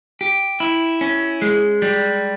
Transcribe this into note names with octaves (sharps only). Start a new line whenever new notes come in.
G4
E4
C#4
G#3
G3